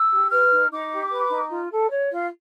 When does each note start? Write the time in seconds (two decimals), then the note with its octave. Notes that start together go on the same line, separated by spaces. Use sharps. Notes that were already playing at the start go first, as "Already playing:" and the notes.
Already playing: E6
0.11 G4
0.31 B4 F6
0.51 D#4
0.70 D#4 D6
0.91 G4
1.11 B4
1.30 D#4
1.50 F4
1.70 A4
1.90 C#5
2.09 F4